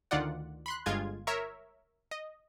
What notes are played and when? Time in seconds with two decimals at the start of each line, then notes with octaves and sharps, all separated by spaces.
0.11 D2 D#3 F4 D5 F#5
0.66 B5 C6 F#6
0.86 G1 G#3 F4 G#6
1.27 A#4 C#5 E5
2.11 D#5